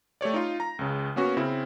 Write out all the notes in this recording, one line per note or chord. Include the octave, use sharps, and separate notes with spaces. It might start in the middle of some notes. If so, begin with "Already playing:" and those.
A3 G4 C#5 D5
D#4 F4
A#5
C#2 C#3
A#3 B3 C#4 F#4
C#3 C4 E4